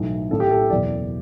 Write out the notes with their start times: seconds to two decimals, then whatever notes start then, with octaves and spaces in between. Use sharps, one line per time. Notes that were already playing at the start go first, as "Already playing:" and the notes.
Already playing: B1 A2 E3
0.31 A1 A2 E3 A4
0.40 G4
0.51 A4
0.70 F#1 E2 B2 D5